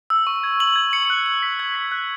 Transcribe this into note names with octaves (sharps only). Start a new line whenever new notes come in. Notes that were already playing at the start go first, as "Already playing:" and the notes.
E6
C#6
G#6
F#7
G#6
C#7
F#6
F#7
B6
G#6
B6
F#6